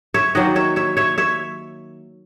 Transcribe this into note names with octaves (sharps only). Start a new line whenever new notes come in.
C#5 E5
D#3 F#3 A#3 D#5 F#5
C#5 E5
C#5 E5
C#5 E5
C#5 E5